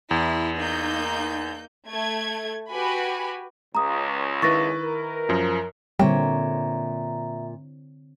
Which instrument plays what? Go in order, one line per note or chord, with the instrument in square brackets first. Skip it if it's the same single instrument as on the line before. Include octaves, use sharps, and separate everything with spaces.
[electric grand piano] E2 [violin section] E4
[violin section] A#3 D#4 G6
A3 G#6
F#4 G4 B4 G#5 B5
[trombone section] C#2 [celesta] A#5 D#6
[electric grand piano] D#3 E4 B4 [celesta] C#6 A6 A#6
[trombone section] A#4
[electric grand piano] F#2 F3
[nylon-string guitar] A#2 [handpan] D3 C4 C#5 [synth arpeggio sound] G3 [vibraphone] E5 A#5